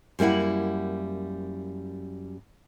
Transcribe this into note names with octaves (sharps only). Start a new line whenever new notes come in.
F#2 G3 A#3 E4 F#5